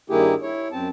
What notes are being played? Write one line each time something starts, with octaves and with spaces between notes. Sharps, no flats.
G2 D#3 A#3 E4 G4 G#4
E4 C#5
F#2 C4 A5